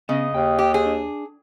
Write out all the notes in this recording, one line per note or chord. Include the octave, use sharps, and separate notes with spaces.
C#3 B3 D#5
D#2 G5
G4
G#4 C5
D4